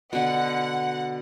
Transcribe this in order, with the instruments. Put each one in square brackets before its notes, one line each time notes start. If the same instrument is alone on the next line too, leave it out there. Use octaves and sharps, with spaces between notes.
[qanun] B2 D3 [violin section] F#5